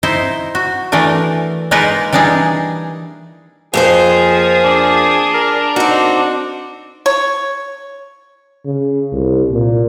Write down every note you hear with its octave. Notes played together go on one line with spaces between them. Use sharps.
D#4 E4 C5
F#4
E3 A3 D4 A#4
G#3 A#3 D#4 F4 A#4 B4
E3 G3 D4 D#4 G#4
F2 F3 A#3 G#4 C5
D4
A#4
C4 D#4 F#4
C#5
C#3
C2
A#2